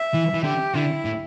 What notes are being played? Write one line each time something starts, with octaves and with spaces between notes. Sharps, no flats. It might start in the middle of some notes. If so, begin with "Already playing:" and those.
Already playing: E5
E3
E3
D3 G4
D3 E4
A2